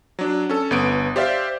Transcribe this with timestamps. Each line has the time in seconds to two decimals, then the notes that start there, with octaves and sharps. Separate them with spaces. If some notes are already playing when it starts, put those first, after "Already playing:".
0.19 F#3 D4
0.49 C#4 A4
0.71 G1 B3 D7
1.16 G4 C5 D5 E5 F5